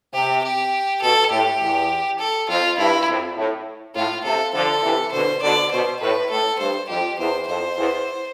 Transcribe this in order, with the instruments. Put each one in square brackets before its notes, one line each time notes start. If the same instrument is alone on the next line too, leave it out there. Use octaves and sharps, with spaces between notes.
[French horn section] C3 [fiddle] G4
[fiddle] G4
[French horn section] B2 [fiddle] A4
[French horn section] A2 [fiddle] G4
[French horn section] E2
[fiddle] A4
[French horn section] F2 [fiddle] F4
[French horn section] G2 [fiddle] E4
[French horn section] F2
A2
[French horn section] A2 [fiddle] F4
[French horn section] C3 [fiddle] A4
[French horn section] D3 F3 [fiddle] A4
[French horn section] C3 E3
[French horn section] B2 D3 [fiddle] C5
[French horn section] B2 D3 [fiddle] D5
[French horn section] B2 [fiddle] C5
[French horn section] A2 [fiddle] B4
[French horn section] A2 [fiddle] A4
[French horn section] G2 [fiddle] C5
[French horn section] F2 [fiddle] G4
[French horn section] E2 [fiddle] C5
[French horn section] F2 [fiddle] C5
[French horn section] E2